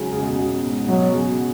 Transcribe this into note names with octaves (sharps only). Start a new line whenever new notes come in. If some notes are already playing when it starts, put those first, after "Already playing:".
Already playing: C#3 F#3 G#3
C#3
B2
C#3
B2
G#2
B2 F#3
C#3